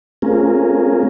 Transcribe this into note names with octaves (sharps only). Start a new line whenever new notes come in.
A3 C4 C#4 F4 G#4 A#4